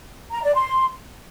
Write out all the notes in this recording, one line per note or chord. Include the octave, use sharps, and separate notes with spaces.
A#5
D5
C6